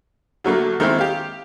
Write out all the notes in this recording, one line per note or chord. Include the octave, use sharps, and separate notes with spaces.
D3 F#3 A3 A#3
D#3 G#3 A#3 C4 E4
G4 F5